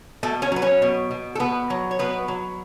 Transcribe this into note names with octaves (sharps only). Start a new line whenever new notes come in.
B2 A3 A4
C#4 C#5
F#3 B4
C#4 C#5
B2
B2
A4
B2 B3 B4
F#3
C#5
B2 B3 B4
F#3